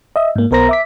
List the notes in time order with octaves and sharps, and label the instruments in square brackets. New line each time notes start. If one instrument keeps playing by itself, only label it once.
[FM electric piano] D#5 E5
G#2 A#3
B1 B3 A#4 C5 A#5 A#6
E5 D6 B6